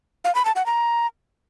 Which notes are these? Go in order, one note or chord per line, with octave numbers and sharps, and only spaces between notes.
F5
B5
A5
F#5
A#5